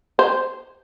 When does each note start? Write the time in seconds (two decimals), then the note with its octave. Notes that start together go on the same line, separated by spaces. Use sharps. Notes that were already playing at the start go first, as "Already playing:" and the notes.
0.19 C5